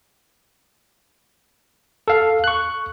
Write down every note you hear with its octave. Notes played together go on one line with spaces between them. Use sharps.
A4 F5
C#6 F#6